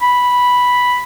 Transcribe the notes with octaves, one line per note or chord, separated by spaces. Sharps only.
B5